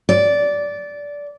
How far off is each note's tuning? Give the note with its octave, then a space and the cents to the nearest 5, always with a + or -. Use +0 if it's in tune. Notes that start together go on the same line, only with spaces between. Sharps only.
D5 -15